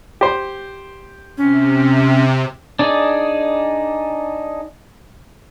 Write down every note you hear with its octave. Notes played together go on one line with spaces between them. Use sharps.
G4 C5
C3 C#4
D4 D#4 G#4 D5